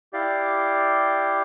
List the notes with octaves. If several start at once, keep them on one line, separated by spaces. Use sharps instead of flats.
E4 G4 D5 F5